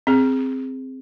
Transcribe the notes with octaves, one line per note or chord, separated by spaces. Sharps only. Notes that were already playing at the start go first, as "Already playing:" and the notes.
C4 G#4